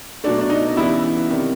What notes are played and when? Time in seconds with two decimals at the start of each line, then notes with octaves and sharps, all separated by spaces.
0.24 B2 F#3 A3 D4
0.41 D4
0.50 D#4
0.77 C#3 E3 G3 B3 E4
1.29 C3 D#3 G3